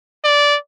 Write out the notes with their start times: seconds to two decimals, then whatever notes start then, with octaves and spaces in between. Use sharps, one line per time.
0.24 D5